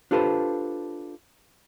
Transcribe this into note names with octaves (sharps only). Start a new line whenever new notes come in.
D4 F4 G4 A4 B4 C5